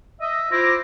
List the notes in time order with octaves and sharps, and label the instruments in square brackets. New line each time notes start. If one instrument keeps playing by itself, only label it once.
[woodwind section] D#5 [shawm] E5
[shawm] E4 [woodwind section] F4 C5 D6 [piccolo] A#6